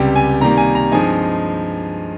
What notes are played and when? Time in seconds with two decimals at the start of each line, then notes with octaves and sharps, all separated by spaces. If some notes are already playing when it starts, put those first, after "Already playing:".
Already playing: C#2 C3 G3 G5
0.15 G#5
0.40 C3 D#3 G3 A#3 A#5
0.57 G#5
0.75 A#5
0.92 G2 F3 G#3 C4 D#4 G#5